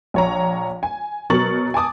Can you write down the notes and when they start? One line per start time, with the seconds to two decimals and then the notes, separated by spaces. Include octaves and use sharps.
0.14 A#1 C#5 A#5
0.83 G#5
1.30 B2 F#3 A#4 C#6 A6 F#7
1.74 G#5 A5 D6 D#6